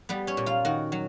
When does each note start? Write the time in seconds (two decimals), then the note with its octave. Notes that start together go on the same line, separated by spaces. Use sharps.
0.09 G3 B3 B4
0.27 C#4 C#5
0.37 A#2
0.46 F4 F5
0.65 D#3 F#4 F#5
0.92 F#3